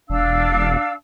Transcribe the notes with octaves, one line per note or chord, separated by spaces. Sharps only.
E1 D4 F5 E6